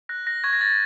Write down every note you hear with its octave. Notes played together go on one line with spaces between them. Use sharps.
F#6 A#6
A#6
C#6 G#6
A#6
A6